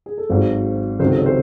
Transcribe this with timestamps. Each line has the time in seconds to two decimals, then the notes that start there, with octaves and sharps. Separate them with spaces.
0.06 G#4
0.18 A4
0.30 G#1 G#2 F#3 C5
1.00 C#2 C3 D#3 F#3 C5
1.08 A4
1.18 C#5
1.26 C5